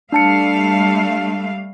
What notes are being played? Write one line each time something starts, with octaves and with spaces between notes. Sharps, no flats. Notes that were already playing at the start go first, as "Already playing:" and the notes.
G3 A3 D4 F5 A5 C#7